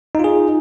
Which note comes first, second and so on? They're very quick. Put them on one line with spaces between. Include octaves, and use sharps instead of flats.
D#4 F4 G#4